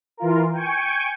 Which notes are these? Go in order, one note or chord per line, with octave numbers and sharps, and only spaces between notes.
E3 F4 A#4
G5 G#5 C#6